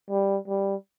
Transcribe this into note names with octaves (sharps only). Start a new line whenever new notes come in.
G3
G3